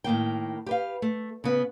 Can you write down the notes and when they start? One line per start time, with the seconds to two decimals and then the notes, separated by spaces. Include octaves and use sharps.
0.04 A2 D#3 A#3 G5
0.66 G4 B4 F5
1.02 A3
1.44 C#3 B3